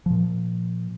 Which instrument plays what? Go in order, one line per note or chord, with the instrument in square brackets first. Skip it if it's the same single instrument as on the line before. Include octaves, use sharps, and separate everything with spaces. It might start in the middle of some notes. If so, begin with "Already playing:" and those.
[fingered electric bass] A#2 F3